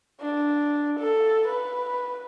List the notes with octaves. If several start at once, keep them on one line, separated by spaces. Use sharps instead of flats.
D4
A4
B4